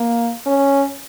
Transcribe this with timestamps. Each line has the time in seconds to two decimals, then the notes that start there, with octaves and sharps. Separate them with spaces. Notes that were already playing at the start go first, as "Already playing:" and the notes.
Already playing: A#3
0.46 C#4